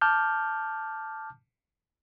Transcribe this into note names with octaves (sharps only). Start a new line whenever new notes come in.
A5 D6 F6 G6